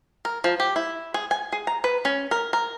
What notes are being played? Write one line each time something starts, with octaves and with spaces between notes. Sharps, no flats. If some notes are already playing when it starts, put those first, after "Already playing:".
A#4
F3
G4
E4
G#4
G#5
G#4
A#5
B4
C#4
A#4
A#4